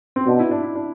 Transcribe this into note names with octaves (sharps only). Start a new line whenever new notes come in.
C4
B2 D4
E4
D4
E4
D4